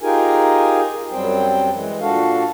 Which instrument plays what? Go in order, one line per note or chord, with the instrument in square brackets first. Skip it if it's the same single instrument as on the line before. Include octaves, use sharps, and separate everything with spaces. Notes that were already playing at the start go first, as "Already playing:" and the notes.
[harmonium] D#4 F4 G4 G#4 A#4 G#5
F#2 F#3 G3 C4 C5 G5
E3 G#3
A#2 D4 F#4 A4 F5